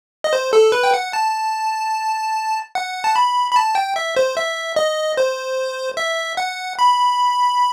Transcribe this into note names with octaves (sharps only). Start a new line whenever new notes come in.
D#5
C5
A4
B4
G5
F#5
A5
F#5
A5
B5
B5
A5
G5
E5
C5
E5
D#5
C5
E5
F#5
B5